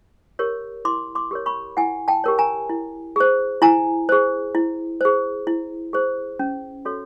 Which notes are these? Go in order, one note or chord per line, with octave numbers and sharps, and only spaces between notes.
G4 A#4 C#5
E4 C6 D6
C6 D6
G4 A#4 C#5
B5 C#6
E4 F#5 G#5
G5 A5
G4 A#4 C#5
G#5 A#5
E4
G#4 C5
E4 G#5 A#5
G#4 C5
E4
G#4 C5
E4
G#4 C5
C#4
F#4 A4 C#5